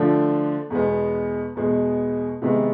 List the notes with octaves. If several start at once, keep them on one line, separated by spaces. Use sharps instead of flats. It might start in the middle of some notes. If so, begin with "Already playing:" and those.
Already playing: D3 F3 A3 D4
E2 B2 G#3 B3
E2 B2 G#3 B3
C3 D#3 G#3 B3